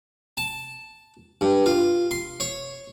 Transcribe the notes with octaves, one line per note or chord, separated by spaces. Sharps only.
A5
G2
F4
C6
C#5